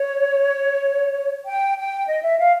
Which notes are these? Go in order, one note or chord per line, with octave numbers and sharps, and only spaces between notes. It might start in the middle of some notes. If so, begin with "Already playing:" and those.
Already playing: C#5
G5
G5
D#5
E5
F5